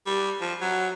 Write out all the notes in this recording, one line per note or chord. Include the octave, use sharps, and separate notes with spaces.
G3
F3
F#3